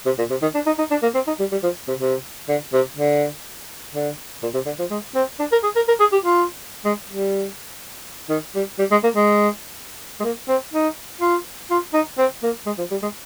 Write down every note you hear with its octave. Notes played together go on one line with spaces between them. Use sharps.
C3
A#2
C3
D#3
D4
D#4
D#4
D4
A#3
C4
D#4
G3
G3
F3
C3
C3
D3
C3
D3
D3
A#2
C3
D3
F3
G#3
C4
D4
A#4
G#4
A#4
A#4
G#4
G4
F4
G#3
G3
D#3
G3
G3
G#3
A#3
G#3
G#3
A#3
C4
D#4
F4
F4
D#4
C4
A#3
G#3
F3
G3
G#3